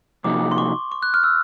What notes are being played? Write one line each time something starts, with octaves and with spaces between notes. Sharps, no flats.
C3 F3 A#3 D#4 F#4 D6
C6
C#6
C#6
F#6
F6
E6